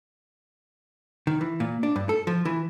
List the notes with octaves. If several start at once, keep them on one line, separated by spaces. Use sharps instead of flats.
D#3
E3
A#2
D4
G2
A4
F3
E3